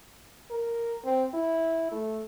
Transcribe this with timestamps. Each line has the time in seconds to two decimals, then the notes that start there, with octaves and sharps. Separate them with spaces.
0.50 A#4
1.04 C4
1.34 E4
1.92 A3